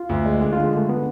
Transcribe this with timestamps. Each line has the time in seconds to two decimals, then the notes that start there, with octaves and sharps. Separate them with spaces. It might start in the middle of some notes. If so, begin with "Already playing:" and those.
Already playing: F4
0.09 D2
0.25 G#3
0.41 D3 G#4
0.53 D3 F4
0.64 G#3
0.73 D3 A3
0.89 B3